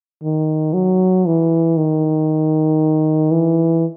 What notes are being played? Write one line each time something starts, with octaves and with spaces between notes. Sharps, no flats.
D#3
F#3
E3
D#3
E3